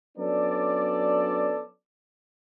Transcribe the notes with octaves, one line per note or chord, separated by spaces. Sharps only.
F#3 B3 C#4 D4 A4 D5